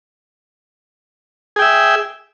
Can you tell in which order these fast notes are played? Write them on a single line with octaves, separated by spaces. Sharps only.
G#4 G5 E5